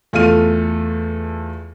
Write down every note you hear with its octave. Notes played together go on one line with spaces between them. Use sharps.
E2 A3 F4 A4 F6 D#7